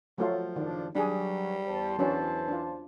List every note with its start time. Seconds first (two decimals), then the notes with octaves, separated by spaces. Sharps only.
0.18 F3 F#3 A3 F4
0.56 F#1 D#3 D4
0.95 F#3 G3 D4 G#4
1.67 E2 C5 A5
1.99 E3 F#3 C#4 D4
2.48 D4 F4